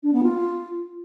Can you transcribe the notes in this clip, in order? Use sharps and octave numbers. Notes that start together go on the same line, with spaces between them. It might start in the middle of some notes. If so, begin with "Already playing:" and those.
D4
B3
F4